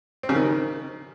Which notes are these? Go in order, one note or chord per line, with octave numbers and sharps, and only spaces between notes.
C4
C#3
D#3